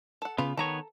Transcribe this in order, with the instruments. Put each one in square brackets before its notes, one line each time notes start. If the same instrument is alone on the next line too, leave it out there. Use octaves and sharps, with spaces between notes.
[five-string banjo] A4 F#5
[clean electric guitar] C#3 B3 [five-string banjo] F4 B4
[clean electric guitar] D#3 B3 C#5 [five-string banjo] A4 A#5